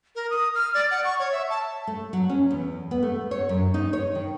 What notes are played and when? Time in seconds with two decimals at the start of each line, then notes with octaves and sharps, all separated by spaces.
0.16 A#4
0.30 D#6
0.55 F6
0.74 D5
0.91 F#5
1.04 C#6
1.19 C#5
1.32 E5
1.50 A5
1.87 A3
2.13 F#3
2.29 C#4
2.51 E2
2.91 B3
3.03 A3
3.31 C#5
3.49 F#2
3.74 D#4
3.93 C#5
4.15 D#3